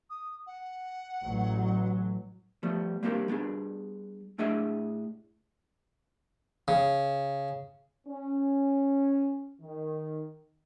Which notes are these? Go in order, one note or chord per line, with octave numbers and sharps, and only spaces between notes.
D#6
F#5
A1 F#3
F3 G3 A3 B3
G3 A#3 C4 D4 G4 A#4
G3 B3 D4 G#4
A2 A3 D4 G#4 D#5 E5
C#3
C#4
D#3